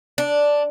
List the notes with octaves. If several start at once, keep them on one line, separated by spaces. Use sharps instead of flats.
D4